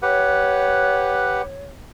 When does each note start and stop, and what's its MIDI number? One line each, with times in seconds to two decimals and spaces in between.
0.02 1.42 67
0.02 1.42 71
0.02 1.65 73
0.02 1.42 78